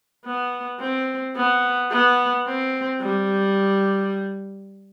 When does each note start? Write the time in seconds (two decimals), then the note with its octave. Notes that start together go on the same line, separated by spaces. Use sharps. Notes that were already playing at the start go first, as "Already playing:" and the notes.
0.25 B3
0.80 C4
1.36 B3
1.91 B3
2.47 C4
3.01 G3